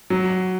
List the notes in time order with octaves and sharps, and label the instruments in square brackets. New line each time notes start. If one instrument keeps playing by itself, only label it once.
[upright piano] F#3